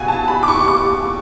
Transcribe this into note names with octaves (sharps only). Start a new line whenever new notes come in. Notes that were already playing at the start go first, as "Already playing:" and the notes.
Already playing: C#2 B2 F#5 G#5
A5
B5
D6
C#6
C#6
D6